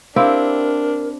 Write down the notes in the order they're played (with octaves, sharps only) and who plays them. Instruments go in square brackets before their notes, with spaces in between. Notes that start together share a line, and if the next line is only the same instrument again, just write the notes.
[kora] C4 E4 G4 [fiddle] D4 [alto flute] A#4 [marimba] F5